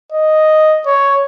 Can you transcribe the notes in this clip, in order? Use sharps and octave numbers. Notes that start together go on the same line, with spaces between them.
D#5
C#5